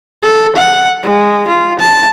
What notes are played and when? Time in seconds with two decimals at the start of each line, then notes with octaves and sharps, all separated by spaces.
0.23 A4
0.56 F#5
1.03 G#3
1.48 F4
1.79 A5